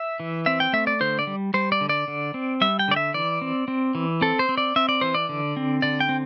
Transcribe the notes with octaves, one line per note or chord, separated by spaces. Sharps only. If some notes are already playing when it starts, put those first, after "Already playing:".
Already playing: E5
E3
C4 E5
G5
A3 E5
D5
D3 C5
D5
G3
G3 C5
D5
D3
D5
D3
C4
G3 E5
G5
D3 D5
E5
E3 D5
C4
C4
E3
C4 A4
C5
C4
D5
C4 E5
D5
E3 C5
D5
D3
C4
D3 D5
G5
C4